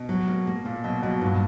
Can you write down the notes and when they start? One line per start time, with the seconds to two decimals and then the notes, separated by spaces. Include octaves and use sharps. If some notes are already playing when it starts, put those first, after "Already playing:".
Already playing: B2
0.09 F#3
0.28 A#3
0.47 A#3
0.65 A#2 A#3
0.84 B2 F#3
1.02 B2 F#3
1.21 G2 A#2